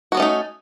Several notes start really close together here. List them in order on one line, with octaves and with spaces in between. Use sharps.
F#4 B3 C#4 A3 D#4